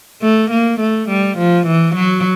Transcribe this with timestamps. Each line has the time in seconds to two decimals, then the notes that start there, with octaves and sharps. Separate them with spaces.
0.22 A3
0.51 A#3
0.80 A3
1.09 G3
1.38 F3
1.67 E3
1.95 F#3